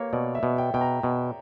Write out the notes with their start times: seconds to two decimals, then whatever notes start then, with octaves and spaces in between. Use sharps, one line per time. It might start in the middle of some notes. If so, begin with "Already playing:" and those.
Already playing: A#3 G4 B4 C#5
0.13 B2 D5
0.35 E5
0.43 B2
0.58 G5
0.74 B2 G5
0.81 A#5
1.03 B2